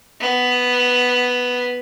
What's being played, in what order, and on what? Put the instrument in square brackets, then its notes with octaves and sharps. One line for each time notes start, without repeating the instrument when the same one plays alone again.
[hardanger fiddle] B3